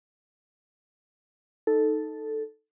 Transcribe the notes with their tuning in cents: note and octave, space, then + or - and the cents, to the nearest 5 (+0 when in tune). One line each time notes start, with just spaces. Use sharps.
D#4 +0 A4 +0